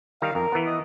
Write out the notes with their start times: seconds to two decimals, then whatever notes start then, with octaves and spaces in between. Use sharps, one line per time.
0.22 D#3 G3 F5 A#5
0.35 F2 A#4
0.52 E3 B3
0.67 D#5